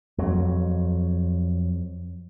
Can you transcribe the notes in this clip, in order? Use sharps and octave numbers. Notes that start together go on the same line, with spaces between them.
F2 F#3